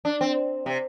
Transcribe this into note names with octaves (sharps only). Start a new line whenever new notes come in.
D4
C4
C3